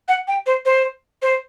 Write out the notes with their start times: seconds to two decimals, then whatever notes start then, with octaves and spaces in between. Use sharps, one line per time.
0.08 F#5
0.28 G5
0.47 C5
0.65 C5
1.22 C5